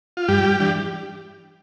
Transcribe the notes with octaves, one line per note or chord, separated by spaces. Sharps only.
F4
G2 G3 G4
E3 G3 D4